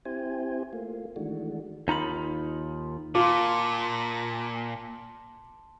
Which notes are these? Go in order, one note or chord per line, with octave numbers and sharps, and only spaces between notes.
C4 E4 G4 C5 G#5
A3 A#3 F4
D#3 E3 G#3 A3 D4 F#4
D#2 D#4 F4 B5
A#2 F4 A5 C6 D6